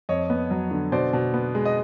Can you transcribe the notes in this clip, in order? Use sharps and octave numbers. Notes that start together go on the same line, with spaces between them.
F2 C#5 D#5
B3
F#3
D3
B2 C5 D5
B2
B3
G#3
D#5